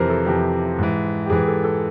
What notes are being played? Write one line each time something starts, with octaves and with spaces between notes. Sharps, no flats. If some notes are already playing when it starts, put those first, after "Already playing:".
Already playing: F2 C3 E3 A#4 C5
A4
F2 C3 E3 G4
G#2 E3
G4
G#2 E3 G#4
A4
A4